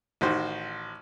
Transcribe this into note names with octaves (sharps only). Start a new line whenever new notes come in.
A1 D#3 F#4 C5